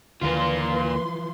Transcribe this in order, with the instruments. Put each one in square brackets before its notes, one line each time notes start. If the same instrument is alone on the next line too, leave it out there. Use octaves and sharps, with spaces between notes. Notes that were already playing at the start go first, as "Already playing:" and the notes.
[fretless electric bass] D#2 D3 [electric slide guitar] E3 F3 [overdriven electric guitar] A#3 F4 [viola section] B4 C6